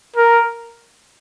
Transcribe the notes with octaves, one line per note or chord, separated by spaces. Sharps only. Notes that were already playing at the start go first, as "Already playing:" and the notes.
A#4